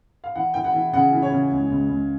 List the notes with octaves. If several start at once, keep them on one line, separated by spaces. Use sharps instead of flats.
F5
E3 F#5
E3 G5
F#5
E3
C#3 F#5
E3
C#5
C#3
C#2
C#2
C#2